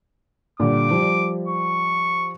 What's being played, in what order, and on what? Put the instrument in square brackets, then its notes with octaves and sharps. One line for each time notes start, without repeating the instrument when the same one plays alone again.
[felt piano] A#2 D3 G3 [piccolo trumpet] D6
[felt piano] F3 G3
[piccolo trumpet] C#6